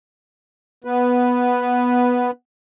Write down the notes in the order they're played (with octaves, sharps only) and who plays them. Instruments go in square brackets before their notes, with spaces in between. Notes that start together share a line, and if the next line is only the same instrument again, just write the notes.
[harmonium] B3 B4